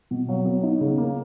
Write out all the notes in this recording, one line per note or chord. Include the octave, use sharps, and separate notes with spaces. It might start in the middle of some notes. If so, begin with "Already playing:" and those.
B2
F#3
B3
D#4
C#3
A#3